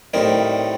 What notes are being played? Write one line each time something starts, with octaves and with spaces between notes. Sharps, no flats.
A2 G3 C4 D#4 A#4